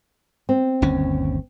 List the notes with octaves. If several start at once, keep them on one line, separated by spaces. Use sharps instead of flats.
C4
G1 D#2 C#4